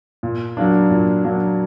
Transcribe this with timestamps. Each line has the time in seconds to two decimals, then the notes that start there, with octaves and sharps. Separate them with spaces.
0.23 A#2
0.57 F#3 A#3 D4
0.91 A#2
1.24 F#3 A#3 D4